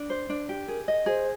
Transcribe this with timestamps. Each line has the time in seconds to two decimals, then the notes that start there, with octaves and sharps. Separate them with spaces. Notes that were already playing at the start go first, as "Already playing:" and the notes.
Already playing: D4
0.10 C5
0.30 D4
0.49 G4
0.68 G#4 A#4
0.88 D#5
1.06 G#4 C5